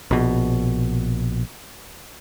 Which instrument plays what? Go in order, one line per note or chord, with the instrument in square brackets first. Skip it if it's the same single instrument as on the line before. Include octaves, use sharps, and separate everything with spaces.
[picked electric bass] A#1 B2